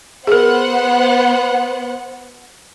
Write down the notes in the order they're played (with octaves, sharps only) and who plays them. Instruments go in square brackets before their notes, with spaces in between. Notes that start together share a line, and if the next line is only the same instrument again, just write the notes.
[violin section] B3 C5 F#5 [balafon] G#4 A#4